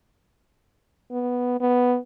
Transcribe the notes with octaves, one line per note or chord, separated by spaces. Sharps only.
B3
B3